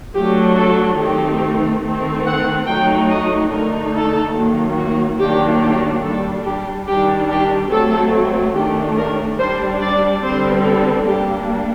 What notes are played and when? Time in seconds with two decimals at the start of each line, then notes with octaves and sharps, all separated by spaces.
0.15 F#3 A3 D4 G4
0.57 A4
0.99 D#3 A3 C4 D#4 G4
1.83 D#3 A3 C4
2.25 F#5
2.67 F#3 A3 D#4 G5
3.09 D#5
3.51 D3 A3 D#4 A#4
3.93 A4
4.35 D#3 F#3 A#3
4.77 F#4
5.19 D#3 F#3 A#3 D4 G4
5.61 G4
6.03 G3 D4 A4
6.45 G4
6.87 D#3 G3 D4 G4
7.29 G4
7.71 F#3 A3 C4 A4
8.55 D#3 A3 D4 G4
8.97 A#4
9.39 G3 D4 C5
9.81 D5
10.23 D3 G3 C4 C5
10.65 A4
11.07 G3 A#3 D4 G4